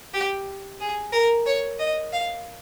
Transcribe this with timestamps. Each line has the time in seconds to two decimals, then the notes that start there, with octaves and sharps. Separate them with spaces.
0.14 G4
0.80 G#4
1.12 A#4
1.46 C#5
1.79 D#5
2.13 F5